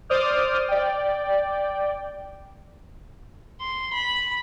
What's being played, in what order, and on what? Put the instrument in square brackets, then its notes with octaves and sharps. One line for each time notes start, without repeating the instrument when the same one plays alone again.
[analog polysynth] C5 D5 D6 D#6 F6 G6
D5 G5
[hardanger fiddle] C6
B5